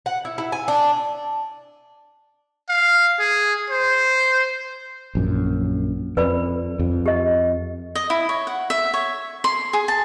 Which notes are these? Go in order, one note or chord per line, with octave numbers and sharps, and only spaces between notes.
F#5
E4
E4
G#5
D4
F5
G#4
C5
A#1 F#2
F2 B4 D5 B5
F2
G4 D#5
D#5
E4
C#5
F#5
E5
C#5
C6
G#4
A5